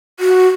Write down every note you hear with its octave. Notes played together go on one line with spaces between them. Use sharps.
F#4